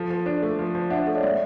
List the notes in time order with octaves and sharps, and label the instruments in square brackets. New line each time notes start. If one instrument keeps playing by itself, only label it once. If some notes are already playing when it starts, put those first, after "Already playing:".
Already playing: [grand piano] F3 [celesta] A4
[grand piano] F3
[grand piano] D4 [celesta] C5
[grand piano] A3
F3
F3
[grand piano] D4 [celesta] E5 F#5
[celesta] C5 D5
[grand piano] A3 [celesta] A4
[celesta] C#5 D#5
[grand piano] G#3 [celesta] D5 E5